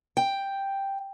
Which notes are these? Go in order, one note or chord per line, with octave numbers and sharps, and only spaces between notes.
G5